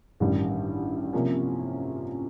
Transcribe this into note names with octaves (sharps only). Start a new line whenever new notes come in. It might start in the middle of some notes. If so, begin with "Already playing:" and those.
A1 G2 D#3 G3
C3 F3 A#3 C#4